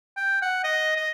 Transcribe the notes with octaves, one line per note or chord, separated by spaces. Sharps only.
G5
F#5
D#5
D#5